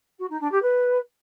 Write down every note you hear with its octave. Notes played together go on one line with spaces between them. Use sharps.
F#4
D#4
D4
G4
B4